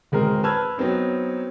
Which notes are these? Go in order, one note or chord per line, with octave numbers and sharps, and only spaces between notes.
D1 G#3 C4 A#4
B4 A5 E6 F6 G#6
F#3 B3 C4 D#4